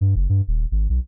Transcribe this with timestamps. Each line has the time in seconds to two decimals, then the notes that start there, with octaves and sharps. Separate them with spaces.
0.01 G2
0.16 F#1
0.29 G2
0.48 D#1
0.71 G#1
0.89 B1